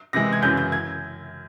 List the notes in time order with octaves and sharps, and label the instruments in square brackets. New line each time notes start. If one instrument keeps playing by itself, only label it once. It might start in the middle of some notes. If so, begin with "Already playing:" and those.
[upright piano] C3 E3 G#3 A#6
G#6
F#2 C#3 E3 G6
G6
G#6